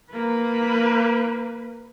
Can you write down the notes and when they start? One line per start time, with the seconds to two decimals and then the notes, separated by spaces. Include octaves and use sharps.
0.11 A#3 B4